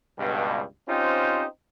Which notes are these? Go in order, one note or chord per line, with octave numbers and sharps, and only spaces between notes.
C#2 G2 B2
C4 C#4 D#4 F4 G4 C5